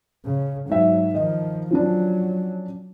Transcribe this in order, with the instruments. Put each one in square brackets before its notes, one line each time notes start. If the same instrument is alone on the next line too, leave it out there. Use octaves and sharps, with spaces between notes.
[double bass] C#3
[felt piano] G#2 E5 [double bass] F#3
[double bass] D#3 F3 [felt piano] D#5
[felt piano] F3 C#4 D4 [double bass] F#3